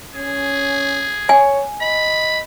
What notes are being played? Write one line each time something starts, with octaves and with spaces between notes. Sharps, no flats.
C#4 G#4
C#5 G#5
D#5 B5